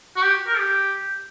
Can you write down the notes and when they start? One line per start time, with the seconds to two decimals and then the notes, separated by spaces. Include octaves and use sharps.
0.16 F#4
0.23 G4
0.47 A#4
0.59 G4